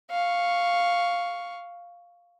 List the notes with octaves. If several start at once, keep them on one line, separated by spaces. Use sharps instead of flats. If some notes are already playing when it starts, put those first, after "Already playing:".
F5 C#6